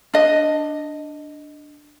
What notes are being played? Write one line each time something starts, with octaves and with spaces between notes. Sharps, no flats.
D4 D#5